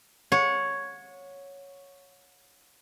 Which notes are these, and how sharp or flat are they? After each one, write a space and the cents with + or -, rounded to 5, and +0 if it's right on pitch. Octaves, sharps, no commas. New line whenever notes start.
C#5 +0 F#5 -35